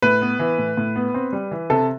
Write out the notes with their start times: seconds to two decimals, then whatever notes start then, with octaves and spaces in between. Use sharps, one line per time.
0.02 A2 B4
0.22 B3
0.39 E3
0.58 A2
0.77 A2
0.96 B3
1.14 C4
1.33 G3
1.51 E3
1.70 C3 A4